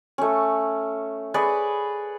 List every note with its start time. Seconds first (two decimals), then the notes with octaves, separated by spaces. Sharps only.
0.18 A3 C#4
1.34 G#4 B4 C#5 D5